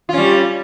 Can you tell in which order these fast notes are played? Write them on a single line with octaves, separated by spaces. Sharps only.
F4 C#4 G3